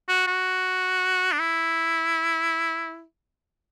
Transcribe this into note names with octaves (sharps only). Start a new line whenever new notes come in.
F#4
F#4
D4
E4